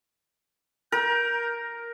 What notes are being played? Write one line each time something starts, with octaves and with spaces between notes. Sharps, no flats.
A#4 G6